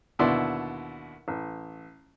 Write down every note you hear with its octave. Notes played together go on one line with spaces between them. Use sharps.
D#2 B2 D3 E4 D5 C6
A1